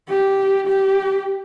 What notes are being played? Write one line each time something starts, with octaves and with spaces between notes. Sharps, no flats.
G4
G4